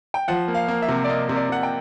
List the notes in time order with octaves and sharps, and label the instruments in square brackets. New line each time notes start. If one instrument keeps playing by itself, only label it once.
[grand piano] G5
F3 F#5
A#3
F5
A#3
E5
C3
D5
A#3 D#5
C3
D5
C3 F#5
G5